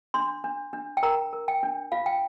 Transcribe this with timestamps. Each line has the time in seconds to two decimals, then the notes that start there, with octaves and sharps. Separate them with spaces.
0.14 D4 C6
0.44 D4
0.73 D4
0.97 G5
1.03 A#4 A#5
1.33 A#4
1.48 G5
1.63 D4
1.92 F4 F5
2.06 G5